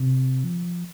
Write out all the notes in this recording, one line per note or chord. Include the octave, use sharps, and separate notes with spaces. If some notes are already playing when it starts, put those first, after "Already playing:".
Already playing: C3
F3